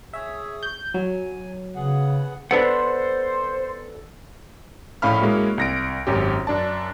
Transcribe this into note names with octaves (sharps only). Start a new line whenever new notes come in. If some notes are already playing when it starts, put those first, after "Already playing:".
G#4 C#5 E5
G6
F#3 G#5
C#3 B3 G#4 F#5
B3 D4 A4 C5 F#5
A#1 A2 C#4 F5 B5 F6
G#3 A#3 C#4 E4 F#4
C2 A#6 D7
G#1 F#2 C#4 G4
F#2 D4 D5 A5